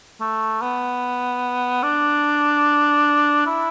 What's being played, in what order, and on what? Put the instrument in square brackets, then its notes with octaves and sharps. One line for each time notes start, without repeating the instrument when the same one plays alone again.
[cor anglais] A3
B3
D4
E4